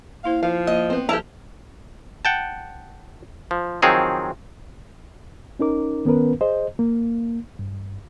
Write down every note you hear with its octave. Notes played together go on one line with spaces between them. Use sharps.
A#3 E4 C5 F5
F3 F5
A#3 D#5
B3 C4
F3 E4 G4 A4 A5 A#5
F#5 G5 A5
F3
D#3 F3 F#3 C4 G#4 C#5
C#4 D#4 A#4 D6
D#3 B3 C#4 A#4 B4
G#4 C5 D#5
A#3
G2